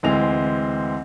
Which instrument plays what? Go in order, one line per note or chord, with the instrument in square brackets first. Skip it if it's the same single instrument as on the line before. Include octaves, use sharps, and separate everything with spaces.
[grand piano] D2 E3 G#3 C4 F7